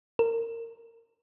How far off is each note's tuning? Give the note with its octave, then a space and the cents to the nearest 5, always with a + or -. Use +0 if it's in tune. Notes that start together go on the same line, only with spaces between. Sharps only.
A#4 -25